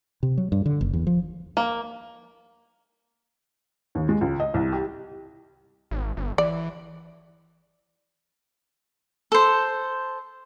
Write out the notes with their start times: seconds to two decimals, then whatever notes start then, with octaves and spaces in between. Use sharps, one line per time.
0.23 C3
0.38 F#3
0.52 G2
0.66 D3
0.81 F#1
0.93 E2
1.07 F3
1.57 A#3
3.95 D#2
4.09 G#3
4.21 C#2
4.40 D#5
4.54 C2
4.72 G4
5.91 G#1
6.17 G1
6.38 E3 D5
9.32 A4 C5